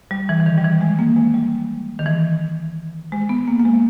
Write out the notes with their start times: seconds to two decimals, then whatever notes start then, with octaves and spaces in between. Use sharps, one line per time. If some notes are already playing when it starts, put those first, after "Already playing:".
0.11 G3
0.29 E3
0.40 E3
0.46 D#3
0.58 G3
0.64 E3
0.81 G#3
0.99 A#3
1.16 G#3
1.34 G3
1.99 D#3
2.06 E3
3.12 G#3
3.29 B3
3.48 A#3
3.60 A#3
3.65 G#3